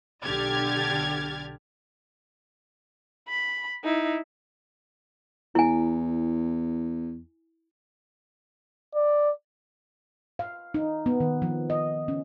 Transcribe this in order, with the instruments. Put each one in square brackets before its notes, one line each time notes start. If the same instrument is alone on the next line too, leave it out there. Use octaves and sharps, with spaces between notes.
[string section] B1 D3 G4 F6 G#6 A6
[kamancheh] B5
D#4 E4
[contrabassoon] E2 [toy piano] E4 G#5
[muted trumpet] D5
[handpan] F5
D#4
B3
D#3
F3
D#5
C#4